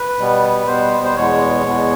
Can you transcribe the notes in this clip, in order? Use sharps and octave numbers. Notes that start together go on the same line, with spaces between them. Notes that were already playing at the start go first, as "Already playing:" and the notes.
Already playing: B4
B2 G3 B3
B2 G3 B3 C5
C5
E2 B2 G#3 B3 C#5
E2 B2 G#3 B3